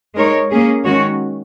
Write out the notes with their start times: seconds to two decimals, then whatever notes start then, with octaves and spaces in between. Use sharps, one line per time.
0.16 G#3 D#4 A#4 C#5
0.50 A#3 C#4 G#4
0.85 D#3 G#3 C#4 F#4 C#5